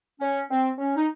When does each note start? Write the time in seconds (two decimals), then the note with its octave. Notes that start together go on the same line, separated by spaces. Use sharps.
0.21 C#4
0.50 C4
0.78 C#4
0.96 D#4